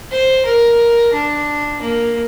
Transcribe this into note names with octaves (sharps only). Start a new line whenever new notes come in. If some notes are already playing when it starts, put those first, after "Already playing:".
C5
A#4
D4
A#3